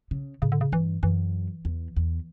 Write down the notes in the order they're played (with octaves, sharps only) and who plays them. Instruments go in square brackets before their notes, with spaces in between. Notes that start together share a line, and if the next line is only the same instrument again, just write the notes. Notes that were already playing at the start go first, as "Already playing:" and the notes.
[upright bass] C#3
[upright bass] A2 [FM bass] C#3
[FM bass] D3
C#3
[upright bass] G2 [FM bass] E3
[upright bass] F#2 [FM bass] E3
[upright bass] E2
E2